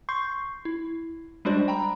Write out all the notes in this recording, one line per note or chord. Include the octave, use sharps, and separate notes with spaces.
C6 C#6 G6 C7
E4
G3 G#3 D4 F#4 C5 D5
G5 A#5 B5